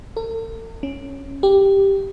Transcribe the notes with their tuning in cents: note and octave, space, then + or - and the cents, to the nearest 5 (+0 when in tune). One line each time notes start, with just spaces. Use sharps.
A4 +45
C#4 +0
G4 +0